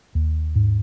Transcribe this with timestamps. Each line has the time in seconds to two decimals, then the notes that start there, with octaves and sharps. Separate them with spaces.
0.15 D#2
0.55 G#2